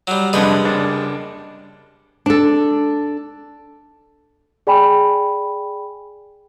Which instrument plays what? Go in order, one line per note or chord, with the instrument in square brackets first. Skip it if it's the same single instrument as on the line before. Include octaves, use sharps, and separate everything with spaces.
[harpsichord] F#3 G3
[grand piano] C2 F2 D3 [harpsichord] G3 G#3 B4
[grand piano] F#1 D4
[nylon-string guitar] D4 A4
[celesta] G#4 D5 G5 G#5 B5